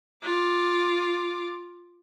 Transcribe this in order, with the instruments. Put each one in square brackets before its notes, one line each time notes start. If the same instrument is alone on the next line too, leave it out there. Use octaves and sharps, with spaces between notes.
[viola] F4 D6